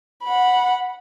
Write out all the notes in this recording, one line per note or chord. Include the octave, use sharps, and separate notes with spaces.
F#5 B5